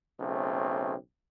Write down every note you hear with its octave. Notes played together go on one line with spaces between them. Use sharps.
B1 C#3 A3 C4